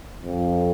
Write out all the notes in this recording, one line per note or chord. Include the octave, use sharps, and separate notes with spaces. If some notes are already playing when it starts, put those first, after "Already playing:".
F2